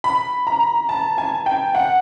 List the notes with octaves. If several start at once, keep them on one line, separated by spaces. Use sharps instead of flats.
B5
A#5
A5
G#5
G5
F#5